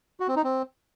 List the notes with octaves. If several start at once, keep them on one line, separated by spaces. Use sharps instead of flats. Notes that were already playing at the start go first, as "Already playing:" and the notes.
F#4
C4
D#4
C4